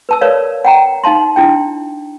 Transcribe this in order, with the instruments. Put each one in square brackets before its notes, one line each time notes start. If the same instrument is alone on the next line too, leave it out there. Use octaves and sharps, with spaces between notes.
[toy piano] B4 A5 E6
A#4 B4 C#5 D5 F5
F#5 G5 A#5
D#4 F5 A5 C6
D4 E4 G5